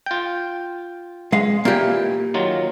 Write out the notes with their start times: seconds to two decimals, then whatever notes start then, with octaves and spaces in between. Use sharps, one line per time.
0.06 F4 G5
1.33 G#3 F5
1.65 A#2 E3 A#3 G4
2.34 D#3 F#3 F4